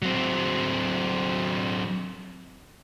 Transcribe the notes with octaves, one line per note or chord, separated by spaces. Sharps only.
F#3 C4